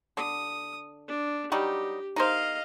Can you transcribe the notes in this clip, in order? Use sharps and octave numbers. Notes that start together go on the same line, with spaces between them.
D3 D#6
D4
F#3 G3 D#4 G4
D#4 A#4 C5 D#5 F5